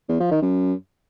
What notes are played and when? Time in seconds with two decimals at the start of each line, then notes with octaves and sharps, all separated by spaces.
0.09 E2
0.20 F3
0.31 D#3
0.42 F#2